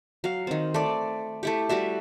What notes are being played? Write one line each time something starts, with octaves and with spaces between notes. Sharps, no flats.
F#3 F5
D#3 C4
A3 D5
A3 E4 G4
G3 E4 F#4 E5